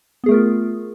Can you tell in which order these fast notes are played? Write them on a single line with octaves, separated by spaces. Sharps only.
B3 G#4 A3 A#4 F4